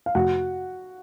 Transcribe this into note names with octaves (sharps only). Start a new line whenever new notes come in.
F5
F2 C3 F3 A3 F#4 F#5